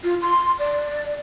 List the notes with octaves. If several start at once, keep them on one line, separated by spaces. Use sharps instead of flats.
F4
C6
D5